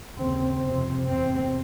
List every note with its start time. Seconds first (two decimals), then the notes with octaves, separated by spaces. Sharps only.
0.18 D#2 C#3 C4
0.63 F2 C3 C4
1.07 E2 C3 C4